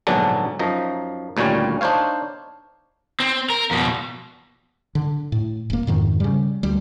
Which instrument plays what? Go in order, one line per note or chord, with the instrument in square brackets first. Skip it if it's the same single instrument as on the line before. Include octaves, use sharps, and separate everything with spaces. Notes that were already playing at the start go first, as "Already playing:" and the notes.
[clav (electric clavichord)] A#1 G#2 B2 D3 F#3 D4
F#2 F3 D#4 A#5
D2 A#2 D#3 G3 C#4
D4 D#4 C5 C#5 F5
[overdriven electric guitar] C4
A#4
F2 B2
[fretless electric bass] D3
A2
E1 A#3
F2 G#2 D#3
C#3 G3
D2 G3